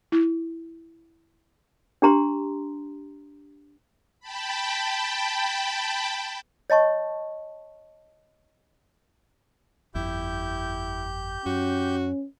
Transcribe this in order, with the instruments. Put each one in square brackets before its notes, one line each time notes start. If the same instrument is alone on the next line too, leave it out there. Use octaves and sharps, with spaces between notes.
[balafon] E4
[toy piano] D4 G4 A#5 C6
[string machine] G5 A5 B5
[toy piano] C#5 D#5 A5 C#6
[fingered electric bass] G1 F2 [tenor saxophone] E4 [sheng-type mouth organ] G4 G6
[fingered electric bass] F#2 [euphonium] C#4 [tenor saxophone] F#4